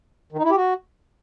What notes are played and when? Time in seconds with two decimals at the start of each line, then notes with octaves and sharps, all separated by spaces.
0.32 D#3
0.38 D#4
0.44 E4
0.50 G4
0.57 F#4